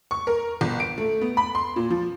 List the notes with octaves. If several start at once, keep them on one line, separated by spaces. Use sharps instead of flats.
C#6
A#4
G1
D7
A3
B3
B5
C6
A#2
F3